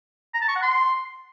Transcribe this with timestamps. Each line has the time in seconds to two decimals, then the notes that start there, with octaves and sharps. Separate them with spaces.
0.34 A#5
0.41 A5
0.48 C#6
0.55 F#5
0.62 C6